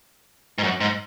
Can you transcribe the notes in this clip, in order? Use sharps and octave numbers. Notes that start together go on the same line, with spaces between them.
G#2
F#2
G#2